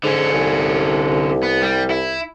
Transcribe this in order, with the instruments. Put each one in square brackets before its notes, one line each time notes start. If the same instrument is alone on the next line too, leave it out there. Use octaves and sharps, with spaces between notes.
[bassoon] G#2 [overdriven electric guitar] D3 C#4
[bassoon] C2
[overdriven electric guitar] B3
G3
E4